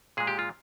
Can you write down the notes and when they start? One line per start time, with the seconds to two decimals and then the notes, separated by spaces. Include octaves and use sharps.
0.17 A#2 G#3 G#4
0.27 G4
0.39 F4